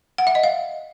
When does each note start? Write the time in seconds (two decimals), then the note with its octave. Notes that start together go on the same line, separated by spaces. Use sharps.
0.18 F#5
0.27 E5
0.35 D#5
0.43 F5